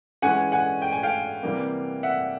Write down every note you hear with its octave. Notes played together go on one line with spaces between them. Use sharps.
E3 G#3 C#4 F#5 G#5
F#5 G#5
G5
G#5
F5 G5
C3 E3 G3 A#3
E5 F#5